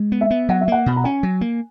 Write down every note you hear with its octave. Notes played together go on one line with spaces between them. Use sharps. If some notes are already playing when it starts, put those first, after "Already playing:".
Already playing: G#3
B3
E5
B3
F#3 F#5
E5
A#3 F#5
B2 B5
A#5
C#4 G#5
F#3
A#3